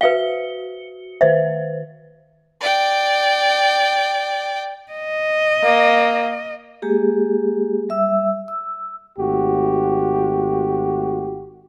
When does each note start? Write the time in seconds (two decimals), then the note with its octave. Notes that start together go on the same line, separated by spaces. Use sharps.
0.01 F#4 B4 E5 F5 C#7 G7
1.21 D#3 B4 C5 E5
2.61 D5 G5
4.92 D#5
5.63 A#3
6.82 G#3 A#3 G4 G#4
7.89 G3 E5 E6
8.48 E6
9.18 G#1 A3 F#4 G4